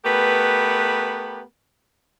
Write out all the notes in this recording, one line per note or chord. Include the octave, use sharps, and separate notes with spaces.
A3 B3 G4 A#4 B4